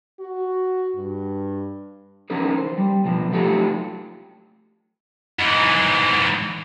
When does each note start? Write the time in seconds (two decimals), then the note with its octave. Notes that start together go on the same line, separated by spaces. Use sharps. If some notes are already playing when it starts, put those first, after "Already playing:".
0.20 F#4
0.96 G2
2.30 E3 C#4 D#4 G#4 A#4
2.57 C5
2.78 G3
3.04 B2 F3
3.32 F3 F#3 A3 D#4 F4 G4
5.39 G#2 E3